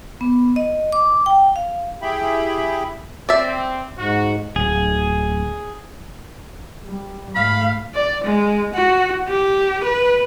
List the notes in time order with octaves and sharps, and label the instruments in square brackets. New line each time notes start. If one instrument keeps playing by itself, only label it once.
[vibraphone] B3
D#5
D6
G5
F5
[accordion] E4 G4 G#4 E5 G5 B5
[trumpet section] C4 [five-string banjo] D5 E5
[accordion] G#2 [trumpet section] F#4
[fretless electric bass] D1 [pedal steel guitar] G#4
[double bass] G3
[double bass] G#2 A3 [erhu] F5 [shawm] B5
[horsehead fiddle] D5
G#3
F#4
G4
B4